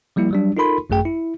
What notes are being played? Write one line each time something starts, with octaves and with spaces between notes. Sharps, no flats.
F3 G3 A#3 E4
F#3 G3 D4
D#4 F4 A4 A#4 B5 C6
G#1 F#2 A3 G#4 G5
E4